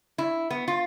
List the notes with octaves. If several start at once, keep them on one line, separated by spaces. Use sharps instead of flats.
E4
B3
F4